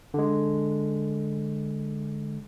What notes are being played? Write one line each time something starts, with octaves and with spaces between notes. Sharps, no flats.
D3 G#3